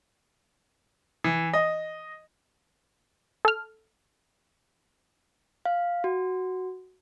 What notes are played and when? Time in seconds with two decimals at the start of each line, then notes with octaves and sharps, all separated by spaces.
1.24 E3
1.53 D#5
3.45 A4 F6
5.65 F5
6.04 F#4